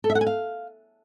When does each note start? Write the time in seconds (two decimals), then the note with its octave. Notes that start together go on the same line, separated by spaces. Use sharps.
0.04 A4
0.10 E5
0.15 F#5
0.21 G#5
0.27 F5